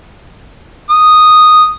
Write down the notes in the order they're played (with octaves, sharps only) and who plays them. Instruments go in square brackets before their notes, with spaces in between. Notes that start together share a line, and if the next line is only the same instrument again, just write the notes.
[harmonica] D#6